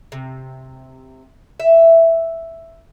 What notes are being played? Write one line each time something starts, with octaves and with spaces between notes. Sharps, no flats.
C3
E5